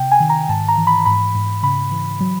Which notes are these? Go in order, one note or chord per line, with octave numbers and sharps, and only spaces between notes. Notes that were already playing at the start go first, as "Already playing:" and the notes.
Already playing: C3 G5
G#5
D#3
A#5
G#2 A5
A#5
E3
B5
G#2 B5
G#2
C#3 B5
E3
F#3